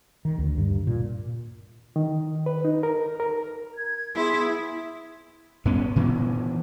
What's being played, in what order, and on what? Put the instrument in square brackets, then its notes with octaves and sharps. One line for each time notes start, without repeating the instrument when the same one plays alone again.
[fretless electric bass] D#3
D2
G2
A#2
[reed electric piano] D#3
B4
D#4
A#4
A#4
[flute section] G#6
[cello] B3 E4 [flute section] G#4 C6
[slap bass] G2 B3 C#4
A#2 E3 B3